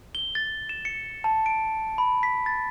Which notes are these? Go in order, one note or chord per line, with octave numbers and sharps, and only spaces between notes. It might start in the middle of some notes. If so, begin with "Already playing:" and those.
G7
A6
E7
C#7
A5
D7
B5
B6
A6